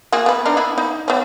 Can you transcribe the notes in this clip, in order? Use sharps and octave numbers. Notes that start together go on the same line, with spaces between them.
A#3 F#4 G#4
B3 B4
D4 D#4 A#4
B3 E4 B5
D#4
B3 C#4